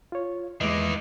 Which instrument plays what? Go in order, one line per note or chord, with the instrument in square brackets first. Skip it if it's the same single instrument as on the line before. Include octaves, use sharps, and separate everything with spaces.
[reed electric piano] F4 C#5
[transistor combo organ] E2 B4 E5 [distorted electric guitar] D#3 A#3 [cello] G#3 [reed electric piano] D#5 D6